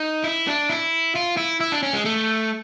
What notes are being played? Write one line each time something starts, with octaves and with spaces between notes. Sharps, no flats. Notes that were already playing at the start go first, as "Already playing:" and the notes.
Already playing: D#4
E4
D4
E4
F4
E4
E4
D4
C#4
G#3
A3